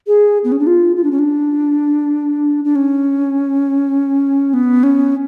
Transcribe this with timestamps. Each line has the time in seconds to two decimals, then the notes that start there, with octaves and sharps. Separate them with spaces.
0.07 G#4
0.44 B3
0.52 C#4
0.59 D4
0.67 F4
0.96 F4
1.04 D4
1.11 C#4
1.19 D4
2.64 D4
2.75 C#4
4.54 B3
4.83 C#4